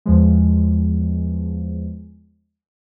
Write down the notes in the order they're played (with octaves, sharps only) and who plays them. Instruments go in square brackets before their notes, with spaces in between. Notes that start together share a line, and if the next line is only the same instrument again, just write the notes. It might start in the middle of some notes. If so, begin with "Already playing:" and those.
[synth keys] E2 F3 G#3